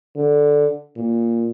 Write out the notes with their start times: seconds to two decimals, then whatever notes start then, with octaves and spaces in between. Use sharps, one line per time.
0.16 D3
0.96 A#2